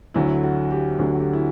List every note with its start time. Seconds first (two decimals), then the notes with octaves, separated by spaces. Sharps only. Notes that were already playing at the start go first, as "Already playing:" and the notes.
0.14 D2 D3 F#3 E4
0.43 F#4
0.71 G4
0.99 D2 D3 F#3
1.15 F#4
1.20 G4
1.33 E4